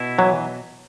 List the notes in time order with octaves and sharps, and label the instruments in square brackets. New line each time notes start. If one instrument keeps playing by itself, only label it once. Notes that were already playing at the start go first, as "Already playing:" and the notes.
Already playing: [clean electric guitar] B2 E4
[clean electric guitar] E3 [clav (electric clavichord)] F#3